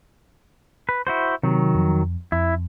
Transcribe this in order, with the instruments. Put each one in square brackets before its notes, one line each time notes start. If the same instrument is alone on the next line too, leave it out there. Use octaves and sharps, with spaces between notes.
[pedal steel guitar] B4
E4 F#4 C5
[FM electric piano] C3 [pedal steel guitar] D#3 F#3
[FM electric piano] F2
[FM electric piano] F2 [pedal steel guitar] E4